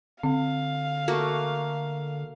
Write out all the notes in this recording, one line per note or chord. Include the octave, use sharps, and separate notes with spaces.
D3 C4 F5
A3 A#3 F#4